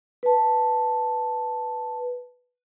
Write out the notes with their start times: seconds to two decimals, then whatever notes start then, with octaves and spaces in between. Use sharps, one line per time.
0.23 B4 A5